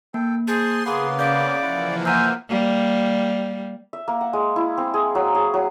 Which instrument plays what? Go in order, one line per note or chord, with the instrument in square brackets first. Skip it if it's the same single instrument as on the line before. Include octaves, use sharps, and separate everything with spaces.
[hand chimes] A#3 [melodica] A4 G5
[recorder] G#4 [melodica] C5 A5 [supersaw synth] C6
[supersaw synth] C#3 [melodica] A#3 B3 B4 [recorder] G#4
[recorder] D5 [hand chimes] F5 G6
[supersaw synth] E3 F3 A#3 [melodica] E4 F#5
[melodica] C5 E5 [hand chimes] F#5 A#5 F6 [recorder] G#5
[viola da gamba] G3 A#3
[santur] E5
A#3
F#5
G#3
E4
C4
G#4
F#3
G#4
F#3